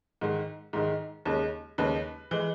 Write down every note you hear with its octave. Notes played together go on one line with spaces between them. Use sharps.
G#2 D#3 G#3
G#2 D#3 G#3
D#2 C#3 G#3
D#2 C#3 G#3 B4
E3 G#3